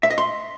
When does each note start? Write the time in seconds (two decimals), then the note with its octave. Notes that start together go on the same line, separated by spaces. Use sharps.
0.03 E5
0.11 D#5
0.18 C6